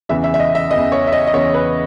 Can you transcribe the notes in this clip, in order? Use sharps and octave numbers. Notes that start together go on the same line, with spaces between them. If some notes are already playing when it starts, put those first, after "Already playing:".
E2 C#3 E3 E5
E5
E5
D#5
E5
E2 C#3 E3 D#5
C#5
E5
D#5
D#5
E2 C#3 E3 C#5
B4